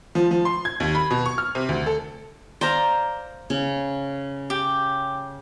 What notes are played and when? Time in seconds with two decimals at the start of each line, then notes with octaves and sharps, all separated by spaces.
0.15 F3
0.31 F3
0.45 C6
0.65 G#6
0.80 D#2
0.95 B5
1.11 B2
1.26 C#6
1.38 F6
1.55 C3
1.69 D2
1.86 A4
2.61 C5 D5 F5 A#5
3.50 C#3
4.50 G4